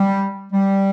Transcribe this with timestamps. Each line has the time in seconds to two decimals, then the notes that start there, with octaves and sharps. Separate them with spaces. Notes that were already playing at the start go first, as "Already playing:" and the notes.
Already playing: G3
0.53 G3